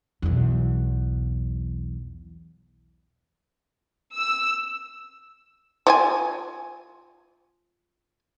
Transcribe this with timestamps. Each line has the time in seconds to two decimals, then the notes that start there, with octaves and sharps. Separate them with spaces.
0.22 B1 E2
4.15 E6
5.87 F3 E5 G#5